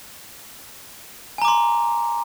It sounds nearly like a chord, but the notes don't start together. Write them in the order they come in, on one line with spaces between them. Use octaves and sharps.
G#5 A#5 D6 C6